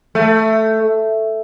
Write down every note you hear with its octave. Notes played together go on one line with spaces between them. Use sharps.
A3